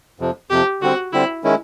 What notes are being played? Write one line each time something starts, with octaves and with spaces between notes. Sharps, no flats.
F2 C3 F3
F2 C3 F3 G4
D3 G3 C4 F#4
D3 G3 C4 E4
D#3 G#3 C#4 E4